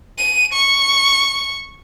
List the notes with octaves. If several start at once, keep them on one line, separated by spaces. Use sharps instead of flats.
D#7
C#6